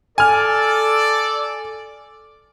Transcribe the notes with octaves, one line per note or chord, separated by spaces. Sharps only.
A4 D5 G#5 F6